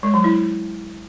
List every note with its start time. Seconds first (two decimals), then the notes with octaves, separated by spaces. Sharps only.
0.03 G#3
0.14 F#3
0.24 E4